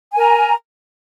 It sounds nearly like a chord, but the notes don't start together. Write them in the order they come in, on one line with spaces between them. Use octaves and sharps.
G#5 A#4 A#5